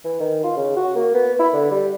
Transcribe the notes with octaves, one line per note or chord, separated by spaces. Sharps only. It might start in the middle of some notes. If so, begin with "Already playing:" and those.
E3
D#3
F4
C#3
F#4
A#3
B3
E4
D3
G3